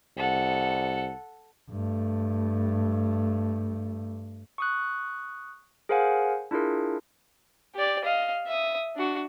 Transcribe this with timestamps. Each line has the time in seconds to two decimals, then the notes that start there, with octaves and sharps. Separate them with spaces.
0.17 C2 A4 F#5
1.70 G2 A3
4.58 C#6 D#6 F#6
5.89 G#4 A#4 C5 F5 F#5 G#5
6.51 D4 E4 F4 G#4 A#4
7.75 G4 D5
8.04 D#5 F5
8.47 E5 D#6
8.96 D4 F#4